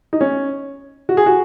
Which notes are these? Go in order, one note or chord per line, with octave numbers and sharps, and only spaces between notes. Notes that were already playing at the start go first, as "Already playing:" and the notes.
D#4
C#4
F#4
G#4
F#4